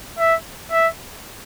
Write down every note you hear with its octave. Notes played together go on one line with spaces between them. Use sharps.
E5
E5